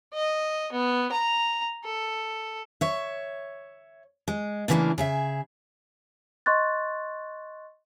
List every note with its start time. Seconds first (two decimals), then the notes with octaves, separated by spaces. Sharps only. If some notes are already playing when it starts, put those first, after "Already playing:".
0.14 D#5
0.72 B3
1.12 A#5
1.85 A4
2.81 C#5 E5
4.28 G#3
4.68 A2 C#3 E3 G#3 A#3 D4
4.98 C#3 G#4 E5
6.46 D#5 C6 C#6 F#6 A6